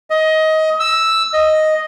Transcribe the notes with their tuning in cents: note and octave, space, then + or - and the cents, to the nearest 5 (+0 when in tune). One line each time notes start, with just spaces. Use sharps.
D#5 +20
E6 +0
D#5 +0